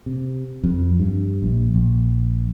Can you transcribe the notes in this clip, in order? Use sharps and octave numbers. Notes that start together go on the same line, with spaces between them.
C3
F2
G2
A#1
A#1